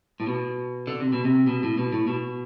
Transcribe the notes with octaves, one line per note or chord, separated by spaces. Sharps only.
A2
B2
D3
C3
B2
C3
B2
A2
B2
A2
B2